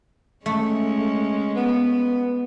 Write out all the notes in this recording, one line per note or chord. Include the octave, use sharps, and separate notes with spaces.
G#3 A3 C#4
B3